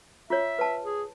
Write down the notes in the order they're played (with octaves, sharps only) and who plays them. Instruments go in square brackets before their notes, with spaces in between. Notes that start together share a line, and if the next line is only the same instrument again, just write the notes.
[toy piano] F4 C#5 [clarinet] E5
[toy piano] B4 A5
[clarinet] G#4